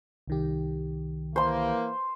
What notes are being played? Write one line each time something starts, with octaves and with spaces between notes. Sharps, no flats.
C2 D#3 G4
E3 A#3 C5 C6